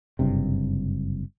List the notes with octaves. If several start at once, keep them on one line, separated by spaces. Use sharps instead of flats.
F#1 G2 C3